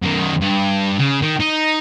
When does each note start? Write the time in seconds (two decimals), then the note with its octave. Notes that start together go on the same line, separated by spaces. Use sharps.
0.03 F#2 D#3
0.41 G2
0.98 C#3
1.22 D#3
1.40 D#4